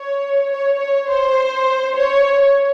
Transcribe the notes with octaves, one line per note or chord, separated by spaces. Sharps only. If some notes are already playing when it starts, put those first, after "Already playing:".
Already playing: C#5
C#5
C#5
C5
C#5